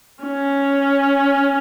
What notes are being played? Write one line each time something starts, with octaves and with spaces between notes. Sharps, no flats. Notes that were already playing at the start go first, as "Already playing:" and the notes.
C#4